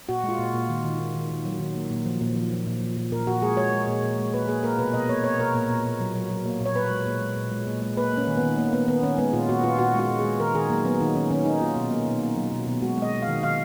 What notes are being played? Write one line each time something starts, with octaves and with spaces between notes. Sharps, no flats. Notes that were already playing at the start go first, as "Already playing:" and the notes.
A#2 F#4
G#3
F4
A#2
A#2
D#3
D#3
D#3
D#3
D#3
F#3
D#3
A#3
A#2
F3
A#2
F3
F3
A#2
F3
A#2
A#2 A#4
A#2 F#4
G#3 G#4
G#3 C#5
G#3
A#2
A#2
G#3
A#3 B4
A#3 G#4
A#3 A#4
B2 B4
B2 D#5
A#3 C#5
A#3 C#5
B2 A#4
A#2
A#2
A#2
F#3
F#3
F#3
A#3
A#2 C#5
A#2 B4
G#3
A#2
G#3
A#2
G#3
A#2
G#3
A#3 B4
A#3
C#4
D#3
B3
D#3
A#3
A#3 B3
D#3 B3
D#3 C#4
G#3 B3
A#2 F4
A#2 F#4
A#2 F4
A#2 F#4
G#3 F#4
A#2
G#4
G#3
D#3 A#4
D#3 G#4
F#3 A#3
F#3 B3
D#3 D#4
D#3 C#4
D#3 C#4
D#3 D#4
A#3 F4
B2
A#3
B2
A#3
F#3
B2
B2
G#3 F#4
G#3 D#5
G#3
F5
D#3
D#3 F5